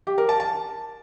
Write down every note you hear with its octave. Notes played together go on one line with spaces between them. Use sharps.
G4
A#4
A5
A5